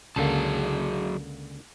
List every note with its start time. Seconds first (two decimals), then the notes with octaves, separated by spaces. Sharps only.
0.16 C#2 D3 F#3 A#3 G#4 A5